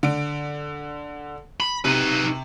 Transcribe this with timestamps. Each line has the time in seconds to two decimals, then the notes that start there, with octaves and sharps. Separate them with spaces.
0.03 D3 D7
1.60 B5
1.85 C3 D#4 B4